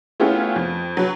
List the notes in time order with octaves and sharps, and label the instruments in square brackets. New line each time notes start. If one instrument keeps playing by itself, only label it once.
[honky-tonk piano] A3 B3 C#4 E4 F4 G4
F2
F#3 B4